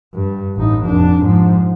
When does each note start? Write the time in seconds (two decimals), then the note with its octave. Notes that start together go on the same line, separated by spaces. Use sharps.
0.14 G2
0.56 A1 D#4
0.85 F1 D4
1.23 G#2 F3